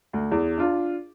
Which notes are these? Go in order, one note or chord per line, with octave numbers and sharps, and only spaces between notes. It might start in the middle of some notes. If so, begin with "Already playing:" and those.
D2
E2
D4 F4